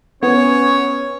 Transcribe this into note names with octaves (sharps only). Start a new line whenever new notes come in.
B3 C#4 C#5